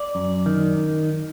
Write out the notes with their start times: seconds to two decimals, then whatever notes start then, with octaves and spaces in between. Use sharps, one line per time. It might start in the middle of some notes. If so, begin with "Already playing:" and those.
Already playing: D5
0.15 F#2
0.46 D#3